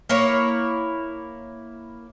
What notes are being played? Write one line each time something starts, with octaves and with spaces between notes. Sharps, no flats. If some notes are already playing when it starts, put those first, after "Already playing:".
A#3 E4 C#5